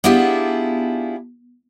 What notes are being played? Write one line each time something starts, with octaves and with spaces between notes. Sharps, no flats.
B3 D4 E4 F4 G4 G#4